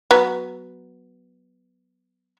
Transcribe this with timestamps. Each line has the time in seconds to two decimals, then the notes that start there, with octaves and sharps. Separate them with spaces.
0.11 F#3 B3